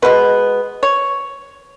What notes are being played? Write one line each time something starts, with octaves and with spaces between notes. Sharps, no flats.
B2 G#3 B3 B4
C#5